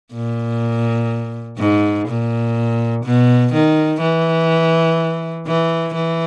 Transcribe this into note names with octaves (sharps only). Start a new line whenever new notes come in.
A#2
G#2
A#2
B2
D#3
E3
E3
E3